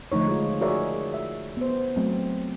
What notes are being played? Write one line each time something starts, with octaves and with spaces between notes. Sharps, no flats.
D3 F3 A3 D#4 C#5
G#3 F4
F#4 G#4 A#4 C#5 D5 E5
E5
B3 C5
F#3 A3 C4